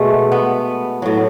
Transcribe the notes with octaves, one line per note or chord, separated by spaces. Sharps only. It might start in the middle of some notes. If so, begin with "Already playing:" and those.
Already playing: B2 G#3 A3
B3
A2 F#3